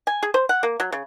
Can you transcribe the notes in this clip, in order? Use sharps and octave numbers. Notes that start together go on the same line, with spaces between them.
G#5
G#4
C5
F#5
A#3
F#3
C#3